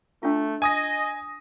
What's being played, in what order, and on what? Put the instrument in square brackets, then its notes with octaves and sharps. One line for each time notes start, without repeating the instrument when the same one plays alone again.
[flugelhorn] A3 [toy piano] D4 F4
[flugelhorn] D#5 [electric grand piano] G#5 D#6 A#6